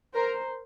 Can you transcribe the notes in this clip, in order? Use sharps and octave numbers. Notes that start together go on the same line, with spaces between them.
A#4 C5